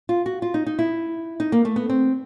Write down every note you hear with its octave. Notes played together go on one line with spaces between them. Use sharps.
F4
F#4
F4
D#4
D#4
E4
D#4
A#3
A3
B3
C4